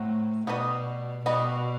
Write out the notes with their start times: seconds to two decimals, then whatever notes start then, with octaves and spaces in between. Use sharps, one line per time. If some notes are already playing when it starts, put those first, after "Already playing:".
Already playing: A2 F#3 C4 F#4
0.47 B2 G3 B3 F#4 B4 D#5
1.26 B2 G3 B3 F#4 B4 D#5